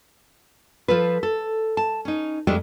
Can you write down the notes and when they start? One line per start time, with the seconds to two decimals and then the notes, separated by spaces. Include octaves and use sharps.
0.88 F3 F4 A4 B4
1.23 A4
1.77 A5
2.05 C#4 D#4
2.47 F2 G#3 A3 D4 G4